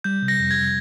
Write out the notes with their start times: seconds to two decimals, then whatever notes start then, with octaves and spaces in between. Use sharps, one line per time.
0.04 G3 G6
0.22 C3
0.28 A#6
0.40 F2
0.51 G#6